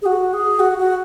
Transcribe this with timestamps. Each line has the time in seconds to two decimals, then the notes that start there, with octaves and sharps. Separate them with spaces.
0.02 G#4
0.06 F#4
0.33 G#4
0.59 F#4
0.78 F#4